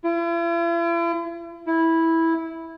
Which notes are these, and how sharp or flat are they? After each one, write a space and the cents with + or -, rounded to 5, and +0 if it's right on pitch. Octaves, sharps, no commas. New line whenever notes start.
E4 +45
E4 -10